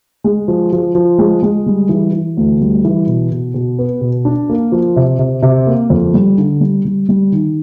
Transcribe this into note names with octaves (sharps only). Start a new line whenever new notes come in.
G#3
F3
F3
F3
G#3
G#3
G3
E3
E3
D2
G3
E3
B2
B2
B2
B3
B2
D4
A#3
F3
C3
C3
C3
A#3
F2
G3
D3
G3
G3
G3
D#3